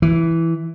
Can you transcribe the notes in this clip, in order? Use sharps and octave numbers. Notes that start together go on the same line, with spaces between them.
E3